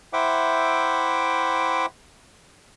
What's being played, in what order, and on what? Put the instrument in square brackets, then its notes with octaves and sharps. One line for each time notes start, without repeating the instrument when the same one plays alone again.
[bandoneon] E4 C5 E5 F#5 G5 D6